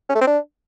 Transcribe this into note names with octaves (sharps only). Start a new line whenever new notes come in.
C#4
A3
C4
D4